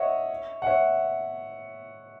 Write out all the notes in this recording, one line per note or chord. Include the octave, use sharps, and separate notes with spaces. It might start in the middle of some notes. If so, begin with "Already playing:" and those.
Already playing: C#5 D#5 E5 F#5
F#5
C#5 E5